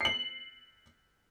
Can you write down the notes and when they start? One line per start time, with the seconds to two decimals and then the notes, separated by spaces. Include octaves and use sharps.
0.01 C7 F#7